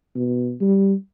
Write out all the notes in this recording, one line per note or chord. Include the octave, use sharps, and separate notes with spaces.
B2
G3